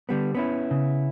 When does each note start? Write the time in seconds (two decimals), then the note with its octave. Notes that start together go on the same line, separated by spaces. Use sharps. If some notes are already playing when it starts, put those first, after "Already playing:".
0.09 D3 G3 B3
0.34 B3 C#4 E4
0.71 C#3